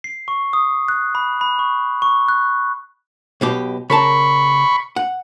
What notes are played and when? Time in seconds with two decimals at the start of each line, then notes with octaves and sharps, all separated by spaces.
0.04 C7
0.28 C#6
0.53 D#6
0.88 F#6
1.15 B5
1.41 B5
1.59 C#6
2.02 C#6
2.29 F#6
3.41 B1 B2 G4
3.90 C#3 A#4 A5 B5 C#6
4.96 F#5